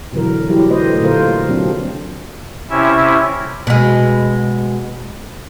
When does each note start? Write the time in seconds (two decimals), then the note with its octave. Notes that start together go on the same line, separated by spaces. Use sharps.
0.13 B2 D3 E3 F#3 A#4
0.49 F#3 G3 E4 G4
0.69 F#3 A3 B4 C5 D#5
1.01 A#2 D3 A3 F4 A#4 C5
1.47 C3 F#3 C4 D4
2.70 C3 C#4 E4 E5
3.67 B2 G#3